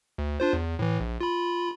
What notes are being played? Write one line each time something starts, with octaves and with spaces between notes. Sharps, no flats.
D2
D4 F4 C5
E2
A2 E3
A#1
F4 B5